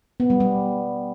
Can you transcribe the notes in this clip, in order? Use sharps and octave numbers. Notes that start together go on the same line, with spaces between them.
B3
G3
G3